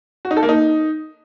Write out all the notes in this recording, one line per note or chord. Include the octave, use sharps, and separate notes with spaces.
F#4
D#4
A4
A#3
D#4